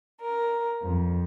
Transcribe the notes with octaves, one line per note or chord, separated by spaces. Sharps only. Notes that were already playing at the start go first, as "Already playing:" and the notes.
A#4
F2